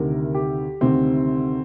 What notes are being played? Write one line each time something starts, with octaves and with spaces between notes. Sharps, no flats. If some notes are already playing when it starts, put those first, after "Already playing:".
Already playing: D2 C3 D#3 A#4
G4
D2 C3 D#3 C4